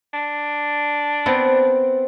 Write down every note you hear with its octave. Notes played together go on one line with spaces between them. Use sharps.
D4
B3 C4